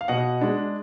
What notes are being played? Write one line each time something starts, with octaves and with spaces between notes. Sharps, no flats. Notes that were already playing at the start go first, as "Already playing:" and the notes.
F5
B2 D#5 F#5
G#3 D4